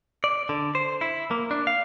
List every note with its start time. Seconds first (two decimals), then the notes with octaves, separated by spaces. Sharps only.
0.24 D5
0.49 D3
0.75 C5
1.01 E4
1.31 A#3
1.51 D4
1.67 F5